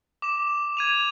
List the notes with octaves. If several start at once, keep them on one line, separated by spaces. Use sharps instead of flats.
D6 E7
G#6 D#7 F7